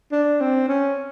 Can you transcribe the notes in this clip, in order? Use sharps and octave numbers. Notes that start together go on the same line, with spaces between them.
D4
C4
C#4